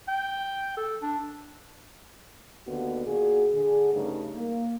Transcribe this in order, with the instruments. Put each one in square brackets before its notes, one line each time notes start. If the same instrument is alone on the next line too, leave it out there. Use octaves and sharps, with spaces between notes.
[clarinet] G5
A4
D4
[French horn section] D#2 D3 B3 F#4
A#2 F#4 G#4
D3 G#4
G2 C#3 A3 D#4
A#3